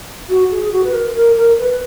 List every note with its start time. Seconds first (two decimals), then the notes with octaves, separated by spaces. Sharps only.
0.29 F#4
0.51 G#4
0.72 F#4
0.84 B4
0.93 A#4
1.16 A#4
1.36 A#4
1.57 B4